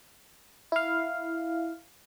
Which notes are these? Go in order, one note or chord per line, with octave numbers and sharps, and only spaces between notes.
E4 F5